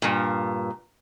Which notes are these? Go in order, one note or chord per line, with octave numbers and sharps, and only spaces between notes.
G2 A#2